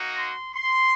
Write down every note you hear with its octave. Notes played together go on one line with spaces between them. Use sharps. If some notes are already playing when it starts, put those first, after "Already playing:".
Already playing: A#3 D#4 F#4
C6
C6